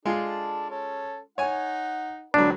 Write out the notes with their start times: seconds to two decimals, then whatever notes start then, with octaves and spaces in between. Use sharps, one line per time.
0.05 G#3 D4 F4 A4
0.70 C#4 A4
1.38 D#4 C#5 F#5 G#5
2.34 C#2 D3 F#3 D4 B4